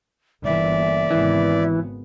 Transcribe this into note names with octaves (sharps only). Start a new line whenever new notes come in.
G1 E3 A#3 D5 E5
G#1 C#3 E3 B3